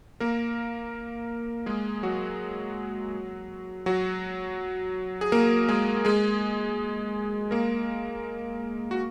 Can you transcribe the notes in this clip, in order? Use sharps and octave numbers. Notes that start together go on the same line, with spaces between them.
A#3 A#4
G#3 G#4
F#3 F#4
F#3 F#4
G#4
A#3 A#4
G#3 G#4
G#3 G#4
A#3 A#4
F#4